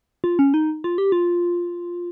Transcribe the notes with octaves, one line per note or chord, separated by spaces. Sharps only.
F4
C#4
D#4
F4
G4
F4